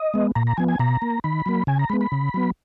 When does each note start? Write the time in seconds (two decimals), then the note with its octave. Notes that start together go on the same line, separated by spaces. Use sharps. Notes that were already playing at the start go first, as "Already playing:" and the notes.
Already playing: D#5
0.14 G#3 B3
0.35 A#2 A#5
0.47 A#5
0.57 F3 B3 G#5
0.68 G#5
0.80 B2 A#5
1.02 A#3
1.24 D#3 B5
1.46 F#3 A#3
1.67 C#3 G#5
1.79 A#5
1.90 G#3 B3 B5
2.01 B5
2.12 C#3
2.34 F#3 B3